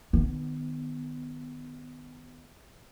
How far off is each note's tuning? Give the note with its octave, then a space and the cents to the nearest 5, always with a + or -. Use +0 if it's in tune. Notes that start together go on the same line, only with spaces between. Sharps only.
D#3 -30 B3 +10